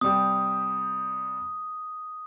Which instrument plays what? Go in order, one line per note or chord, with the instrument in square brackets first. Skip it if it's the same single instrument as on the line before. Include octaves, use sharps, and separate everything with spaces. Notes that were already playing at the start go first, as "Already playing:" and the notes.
[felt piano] C3 G3 G4 [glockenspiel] D#6